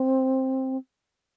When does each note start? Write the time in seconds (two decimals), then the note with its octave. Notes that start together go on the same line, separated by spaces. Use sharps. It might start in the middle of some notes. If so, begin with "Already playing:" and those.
Already playing: C4